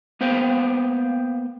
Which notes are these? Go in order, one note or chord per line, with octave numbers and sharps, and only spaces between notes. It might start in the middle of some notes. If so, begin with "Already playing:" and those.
A#3 B3 C5 F5 G5